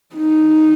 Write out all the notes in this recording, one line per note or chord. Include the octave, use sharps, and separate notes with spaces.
D#4